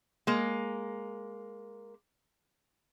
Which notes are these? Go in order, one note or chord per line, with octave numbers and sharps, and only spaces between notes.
G#3 A#3